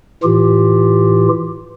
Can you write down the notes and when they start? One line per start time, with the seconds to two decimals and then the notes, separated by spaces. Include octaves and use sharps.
0.23 A2 E3 F4 G4